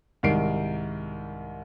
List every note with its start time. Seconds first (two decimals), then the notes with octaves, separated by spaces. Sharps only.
0.23 C2 G#2 D#3 C7 D7